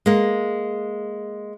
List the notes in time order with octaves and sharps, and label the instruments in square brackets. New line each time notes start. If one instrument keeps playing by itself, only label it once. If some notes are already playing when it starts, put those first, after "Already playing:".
[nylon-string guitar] G#3 A#3